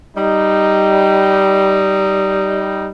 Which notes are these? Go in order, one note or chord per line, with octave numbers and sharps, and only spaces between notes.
G3 D#4